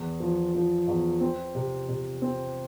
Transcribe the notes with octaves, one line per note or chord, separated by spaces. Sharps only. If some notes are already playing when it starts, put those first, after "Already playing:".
Already playing: E2
F3
F3
E2
C4
C3
C3
C4